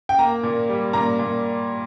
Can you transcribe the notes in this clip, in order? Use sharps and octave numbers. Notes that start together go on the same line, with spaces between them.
G5
A#3 A#5
A#2
G3
A#2 A#5
A#2